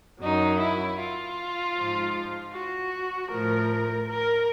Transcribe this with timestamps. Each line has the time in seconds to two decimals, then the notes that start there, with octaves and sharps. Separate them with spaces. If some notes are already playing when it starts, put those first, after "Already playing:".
0.21 F#2 D#3 F#3 D#4
0.59 E4
0.98 F4
1.75 G#2 F3
2.53 F#4
3.29 A2 F3 A#4
4.08 A#4